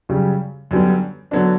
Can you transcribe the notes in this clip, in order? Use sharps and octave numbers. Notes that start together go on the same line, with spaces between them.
F#2 C#3 G3
F#2 D3 G3 B3
D3 F#3 B3 D4